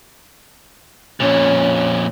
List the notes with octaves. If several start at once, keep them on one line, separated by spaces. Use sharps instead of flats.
F2 A#2 C#4